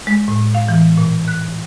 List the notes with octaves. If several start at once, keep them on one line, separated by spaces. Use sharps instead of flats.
G#3
A2
F5
E3
A#2
F#6